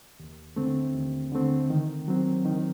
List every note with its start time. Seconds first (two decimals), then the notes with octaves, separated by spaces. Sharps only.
0.20 D#2
0.56 D3 A3 C4
0.94 D#2
1.32 D3 A3 C4
1.70 D#3
2.08 F#3 C4
2.45 D#3